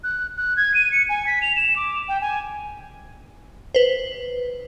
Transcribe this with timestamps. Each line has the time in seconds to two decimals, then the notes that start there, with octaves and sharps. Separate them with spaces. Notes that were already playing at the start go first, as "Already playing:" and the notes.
0.04 F#6
0.37 F#6
0.57 G#6
0.74 D#7
0.92 C#7
1.09 G#5
1.26 B6
1.42 F7
1.56 E7
1.76 D6
2.08 G5
2.21 G#5
3.75 B4 C5